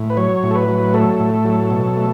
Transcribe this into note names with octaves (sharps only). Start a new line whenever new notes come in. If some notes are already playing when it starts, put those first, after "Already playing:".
Already playing: A2
B4
F#3 C#5
A2
A4
B4
F#3
A3 A4
A2
F#3
B2
A3